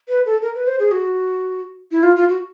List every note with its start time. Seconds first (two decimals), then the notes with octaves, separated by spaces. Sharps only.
0.08 B4
0.26 A4
0.42 A#4
0.55 B4
0.67 C5
0.79 G#4
0.91 F#4
1.92 E4
2.03 F4
2.16 F4
2.29 F#4